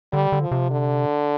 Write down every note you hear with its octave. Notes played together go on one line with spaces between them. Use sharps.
D3 G3
D3
F3
C3
D3